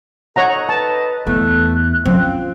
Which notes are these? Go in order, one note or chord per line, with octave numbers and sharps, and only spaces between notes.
D#4 A4 C#5 D#5 F#5 A#5
B4 A5
E2 A3 F#6
F3 C4 C#4 F4